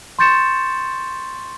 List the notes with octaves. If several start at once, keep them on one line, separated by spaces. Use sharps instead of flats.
C6 C#6 G6 A6 C#7 E7